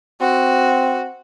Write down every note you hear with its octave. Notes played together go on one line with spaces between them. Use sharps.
C4 F#4